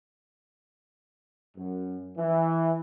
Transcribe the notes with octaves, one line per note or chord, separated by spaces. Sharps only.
F#2
E3